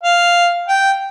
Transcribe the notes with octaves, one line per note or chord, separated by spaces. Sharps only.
F5
G5